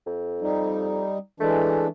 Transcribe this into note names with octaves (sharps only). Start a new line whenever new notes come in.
F2
G3 D#4
E3 G#3 A3 D4